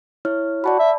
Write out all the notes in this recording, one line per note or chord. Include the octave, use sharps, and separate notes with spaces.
E4 C#5 F6
F#4 D5 A5 B5
E5